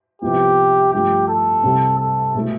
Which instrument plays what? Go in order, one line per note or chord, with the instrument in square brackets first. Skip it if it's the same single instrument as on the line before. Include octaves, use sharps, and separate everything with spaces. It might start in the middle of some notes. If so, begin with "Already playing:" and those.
[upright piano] C2 C3 F3 B3 [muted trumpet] G4
[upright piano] G2 F3 A3 [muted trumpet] G4
[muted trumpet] A4
[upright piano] C2 C3 G3 C4
[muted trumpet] A4
[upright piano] B2 A3 E4